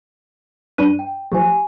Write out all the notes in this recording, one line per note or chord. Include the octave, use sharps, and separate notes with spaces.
G2 D4 B4 D#7
G5
F3 F#3 A3 G4 G#5